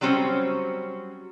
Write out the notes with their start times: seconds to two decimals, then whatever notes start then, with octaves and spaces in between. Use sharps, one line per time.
0.01 F#3 G3 C4 C#4 C5